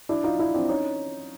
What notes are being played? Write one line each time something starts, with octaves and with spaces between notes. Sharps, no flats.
D4 E4
D#4 F4
D4 E4
C4 D4
C#4 D#4